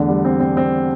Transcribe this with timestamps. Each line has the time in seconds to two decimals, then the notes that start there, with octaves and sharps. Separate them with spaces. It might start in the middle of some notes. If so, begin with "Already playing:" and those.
Already playing: E2 D3 A3
0.09 G3
0.25 C4
0.40 C4
0.57 C4